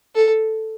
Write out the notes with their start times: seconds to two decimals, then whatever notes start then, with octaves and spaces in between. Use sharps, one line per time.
0.15 A4